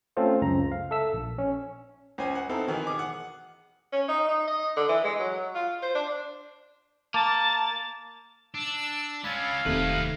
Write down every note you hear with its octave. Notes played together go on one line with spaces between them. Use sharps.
A3 C4 C#4 F4 A4 C5
C#2 F#2 C#3 A#5
F5
A4 E5 E6
A#1
C#4
C#2 C5 G#5
F#5
B3 C4 D#4 E4 A4 C5
B2 D#3 E3 B3
G#4 D6
F#5
C#4
D#4
D#4
D#5
D3
E3
G#3
F#3
F4
C5
D4
A#3 A5
D4 E6
G#3 C#4 F5 B5 E6 A6
E1 D#2 C3 A3 D#4 B4